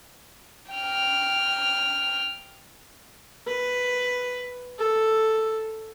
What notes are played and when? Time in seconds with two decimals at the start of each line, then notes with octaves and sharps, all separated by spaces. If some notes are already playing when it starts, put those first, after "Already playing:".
0.71 G5 F6
3.47 B4
4.79 A4